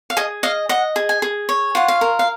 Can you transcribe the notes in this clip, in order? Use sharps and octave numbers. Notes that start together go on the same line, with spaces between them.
F5
G#4 D#5
D#5 F5
D#5 F#5
G#4
G#5
G#4
C#5
F4 F#5
F5
A#4
F5